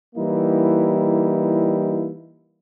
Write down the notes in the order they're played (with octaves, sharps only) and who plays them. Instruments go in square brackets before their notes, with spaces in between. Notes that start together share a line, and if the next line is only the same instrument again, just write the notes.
[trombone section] E3 G3 A#3 D#4 E4